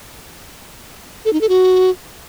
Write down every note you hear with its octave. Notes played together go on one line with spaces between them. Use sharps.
A4
D#4
A4
F#4